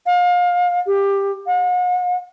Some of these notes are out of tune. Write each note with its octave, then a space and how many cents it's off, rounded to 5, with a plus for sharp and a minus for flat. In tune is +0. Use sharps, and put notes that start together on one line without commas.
F5 +30
G4 +15
F#5 -45